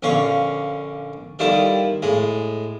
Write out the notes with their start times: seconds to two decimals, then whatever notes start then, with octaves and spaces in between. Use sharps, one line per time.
0.03 A#1 D3 C#4 F5 C#6
1.39 D#3 G3 E4 F4 A4
2.02 A2 G#3